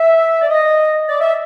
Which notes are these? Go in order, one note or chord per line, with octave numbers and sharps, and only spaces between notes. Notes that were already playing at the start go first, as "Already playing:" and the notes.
Already playing: E5
D5
D#5
D5
E5